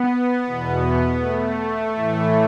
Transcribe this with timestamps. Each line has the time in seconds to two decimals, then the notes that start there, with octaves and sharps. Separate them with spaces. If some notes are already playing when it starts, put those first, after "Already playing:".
Already playing: B3
0.45 E2 B2
1.20 A3
1.95 A2 E3